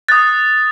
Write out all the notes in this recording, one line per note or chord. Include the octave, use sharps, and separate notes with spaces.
D#6 F#6 A6